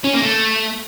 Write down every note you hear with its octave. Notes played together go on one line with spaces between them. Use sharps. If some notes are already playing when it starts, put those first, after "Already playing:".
C#4
A#3
A3